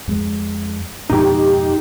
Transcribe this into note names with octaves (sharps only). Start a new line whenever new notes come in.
F2 G#3
F2 G#2 B2 D#4 G4